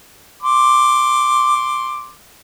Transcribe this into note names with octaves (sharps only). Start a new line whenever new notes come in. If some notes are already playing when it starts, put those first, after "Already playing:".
C6 D6